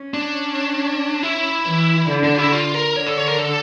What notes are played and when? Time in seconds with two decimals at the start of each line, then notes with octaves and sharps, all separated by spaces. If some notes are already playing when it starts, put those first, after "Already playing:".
Already playing: C#4
0.14 D4
1.23 E4
1.66 E3
2.09 D3
2.24 D4
2.37 E4
2.52 F4
2.74 A#4
2.96 D3 C#5
3.06 A4
3.17 C#5
3.28 A#4
3.39 A4